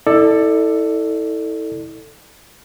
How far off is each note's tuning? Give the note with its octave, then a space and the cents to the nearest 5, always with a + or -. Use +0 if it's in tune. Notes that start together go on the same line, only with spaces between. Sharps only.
E4 -30 A4 +10 D5 +20